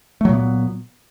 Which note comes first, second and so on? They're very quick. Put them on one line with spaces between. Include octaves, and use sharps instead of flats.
A3 F#3 A#2 B3